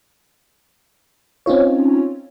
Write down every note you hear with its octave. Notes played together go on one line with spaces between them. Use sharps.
C4 C#4 D#4 F4 C#5